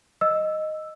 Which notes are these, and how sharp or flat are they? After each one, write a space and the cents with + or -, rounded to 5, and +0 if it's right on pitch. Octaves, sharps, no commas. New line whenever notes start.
D#5 +0 E6 +0